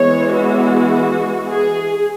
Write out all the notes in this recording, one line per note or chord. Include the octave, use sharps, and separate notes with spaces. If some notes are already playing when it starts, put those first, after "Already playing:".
Already playing: E3 G#3 B3 C#5
F#4
G#4